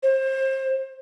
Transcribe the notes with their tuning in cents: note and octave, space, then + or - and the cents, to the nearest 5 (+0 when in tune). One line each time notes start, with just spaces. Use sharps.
C5 +30